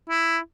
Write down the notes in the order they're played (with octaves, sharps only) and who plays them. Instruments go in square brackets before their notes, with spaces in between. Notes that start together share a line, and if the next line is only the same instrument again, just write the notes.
[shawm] E4